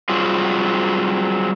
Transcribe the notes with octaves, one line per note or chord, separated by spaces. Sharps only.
F#3 G3 C4 F4 G#4